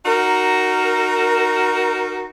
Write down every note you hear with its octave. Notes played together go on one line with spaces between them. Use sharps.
D#4 F#4 A#4